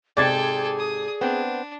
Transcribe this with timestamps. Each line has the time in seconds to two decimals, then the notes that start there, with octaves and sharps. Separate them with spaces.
0.17 G#2 C3 G#4 A4 D5 G5 G#6 A6
0.78 D#6
1.21 B3 C4 D4